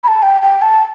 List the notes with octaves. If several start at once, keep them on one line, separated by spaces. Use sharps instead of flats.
B5
A5
G5
G5
A5